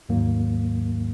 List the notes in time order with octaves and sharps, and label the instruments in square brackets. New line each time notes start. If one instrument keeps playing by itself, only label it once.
[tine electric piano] D#2 G#2 D#3 F#3 A#3